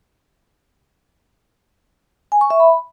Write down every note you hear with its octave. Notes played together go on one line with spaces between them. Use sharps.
G#5
C#6
E5
B5